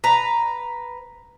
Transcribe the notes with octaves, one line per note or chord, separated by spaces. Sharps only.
B4 A#5